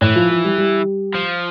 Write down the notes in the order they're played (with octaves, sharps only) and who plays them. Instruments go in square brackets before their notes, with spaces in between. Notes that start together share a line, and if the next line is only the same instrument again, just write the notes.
[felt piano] A2 [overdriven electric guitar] E3
[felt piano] F3
F3
G3
G3
[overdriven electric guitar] F3